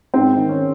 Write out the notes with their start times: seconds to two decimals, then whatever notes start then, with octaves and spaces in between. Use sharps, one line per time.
0.14 G#2 C4
0.37 D#3
0.49 C#4